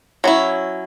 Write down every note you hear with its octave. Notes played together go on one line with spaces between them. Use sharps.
F#3 C#4 E4